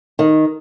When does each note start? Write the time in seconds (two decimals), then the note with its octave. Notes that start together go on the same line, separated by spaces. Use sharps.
0.19 D#3